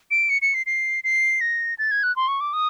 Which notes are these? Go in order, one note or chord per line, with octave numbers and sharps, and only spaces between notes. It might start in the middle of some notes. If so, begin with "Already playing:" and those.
D7
C#7
C#7
C7
C7
C7
A#6
A6
G#6
F#6
C6
C#6
D6
D#6